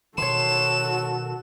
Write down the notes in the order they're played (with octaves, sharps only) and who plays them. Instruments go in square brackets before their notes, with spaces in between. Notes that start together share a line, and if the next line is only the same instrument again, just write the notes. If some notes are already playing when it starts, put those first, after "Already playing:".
[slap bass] B2 D#3 [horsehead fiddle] F#4 A4 [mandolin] C#5 C6 [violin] E7